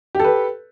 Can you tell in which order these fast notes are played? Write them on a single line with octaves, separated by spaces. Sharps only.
G4 A4 B4